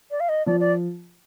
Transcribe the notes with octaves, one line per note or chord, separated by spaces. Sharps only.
D5
F5
D#5
F3 D5
D5